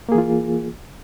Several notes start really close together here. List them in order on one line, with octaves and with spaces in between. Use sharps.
A#3 G#4 E3 F4